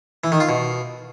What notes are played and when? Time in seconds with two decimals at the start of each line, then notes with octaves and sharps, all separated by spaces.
0.24 E3
0.32 D#3
0.40 F4
0.49 B2